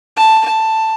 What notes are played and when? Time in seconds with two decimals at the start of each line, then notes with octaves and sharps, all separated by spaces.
0.17 A5
0.46 A5